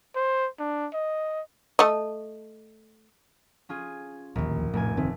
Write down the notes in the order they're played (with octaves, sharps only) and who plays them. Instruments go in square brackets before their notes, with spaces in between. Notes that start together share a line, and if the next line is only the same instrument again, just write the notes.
[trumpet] C5
D4
D#5
[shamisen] A3 D#5
[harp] C#4 F4 G#4
[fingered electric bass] D1 D#2 [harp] A#1
[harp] F1 G#5 [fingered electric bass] A2
[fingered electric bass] G1 D#3 C4 [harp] A3